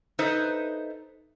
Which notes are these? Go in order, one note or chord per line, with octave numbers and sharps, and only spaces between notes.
D#4 A4 B4 C5 D#5 E5